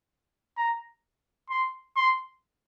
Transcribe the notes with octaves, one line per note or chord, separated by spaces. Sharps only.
A#5
C6
C6